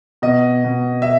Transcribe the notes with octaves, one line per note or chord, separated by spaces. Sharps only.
B2 D#5
B2
E5